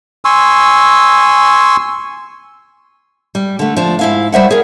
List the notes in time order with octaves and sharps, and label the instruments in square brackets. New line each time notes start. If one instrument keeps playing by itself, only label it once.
[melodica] G#5 C6 C#6 E6
[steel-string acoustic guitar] G3
D3 A3
F3 D4
G#2 E4 F5
G3 C5 E5 F#5
G#4 A#4